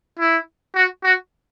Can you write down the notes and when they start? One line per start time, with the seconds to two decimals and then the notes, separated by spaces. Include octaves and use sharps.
0.19 E4
0.76 F#4
1.04 F#4